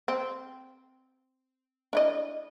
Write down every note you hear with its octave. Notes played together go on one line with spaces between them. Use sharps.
C4
D4 E4 D#5